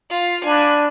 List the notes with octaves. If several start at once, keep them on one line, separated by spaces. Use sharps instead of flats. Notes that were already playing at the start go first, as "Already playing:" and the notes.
F4
D4 G#5 B5